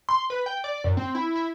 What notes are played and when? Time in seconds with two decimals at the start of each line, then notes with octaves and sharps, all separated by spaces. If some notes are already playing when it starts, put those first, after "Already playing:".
0.09 C6
0.30 B4
0.46 G5
0.64 D5
0.84 F#2
0.97 C4
1.15 E4
1.36 E4